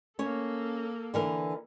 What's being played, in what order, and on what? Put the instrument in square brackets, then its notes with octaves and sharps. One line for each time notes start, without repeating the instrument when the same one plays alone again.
[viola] A#3 A4 [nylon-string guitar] C#4 C#5
[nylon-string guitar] D3 E3 A#4